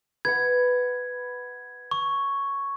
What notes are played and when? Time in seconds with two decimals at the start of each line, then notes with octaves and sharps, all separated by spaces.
0.25 B4 F#5 G#6
1.91 C#6